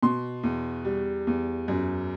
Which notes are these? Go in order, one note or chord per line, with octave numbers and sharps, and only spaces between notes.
B2 C6
E2
G3
E2
F#2